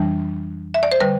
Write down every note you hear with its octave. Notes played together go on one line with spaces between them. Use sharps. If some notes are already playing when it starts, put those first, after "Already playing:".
Already playing: F2 E3 G3 D4
E5
D5
C5
D3 G3 B4